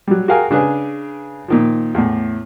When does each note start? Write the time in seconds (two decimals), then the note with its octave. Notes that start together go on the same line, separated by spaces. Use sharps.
0.07 F#3 G3
0.28 F#4 G#4 A#4 F5 G5 G#5
0.51 C#3 D4 G#4 B4 G#5
1.48 A#2 D#3 F3
1.95 E2 A2